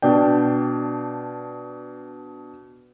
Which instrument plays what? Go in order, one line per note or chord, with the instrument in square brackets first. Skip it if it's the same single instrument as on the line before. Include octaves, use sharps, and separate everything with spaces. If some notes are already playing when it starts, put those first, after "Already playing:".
[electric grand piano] B2 D4 D5 G5